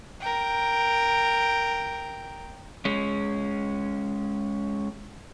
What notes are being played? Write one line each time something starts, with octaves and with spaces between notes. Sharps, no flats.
A#4 G5
G#3 C#4